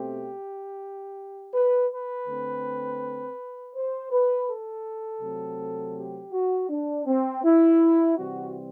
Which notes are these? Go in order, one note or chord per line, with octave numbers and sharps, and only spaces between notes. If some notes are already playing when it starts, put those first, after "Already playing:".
Already playing: B2 A3 C4 G4
B4
B4
D3 A3 C4
C5
B4
A4
C3 F#3 A3 C4
G4
F#4
D4
C4
E4
C3 E3 G3 C4 F#4